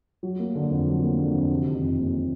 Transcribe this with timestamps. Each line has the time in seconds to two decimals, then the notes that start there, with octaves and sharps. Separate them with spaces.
0.23 F#3
0.39 A#3
0.55 D3
0.71 F2
0.87 F#3
1.02 A#3
1.18 D3
1.34 F2
1.50 C3
1.66 D#3
1.82 F2
1.98 F#1
2.13 C3